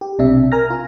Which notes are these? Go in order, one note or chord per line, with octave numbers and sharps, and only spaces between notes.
G4
B1 C3 D4 E5
A#4 G#5 F6 A#6
F4